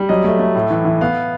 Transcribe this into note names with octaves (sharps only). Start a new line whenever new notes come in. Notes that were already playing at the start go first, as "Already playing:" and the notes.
Already playing: G3
F#3 D#5
A3
A3
A2
E3
E3
B3 F5